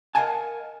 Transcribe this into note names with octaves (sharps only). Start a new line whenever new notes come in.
A#4 D#5 F5 F#5 G#5 A5